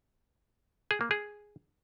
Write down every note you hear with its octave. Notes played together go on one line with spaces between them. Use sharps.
G#4
A#3
G#4